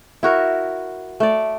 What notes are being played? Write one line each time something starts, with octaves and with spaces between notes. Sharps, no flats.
E4 F#4 A#4
A3 D5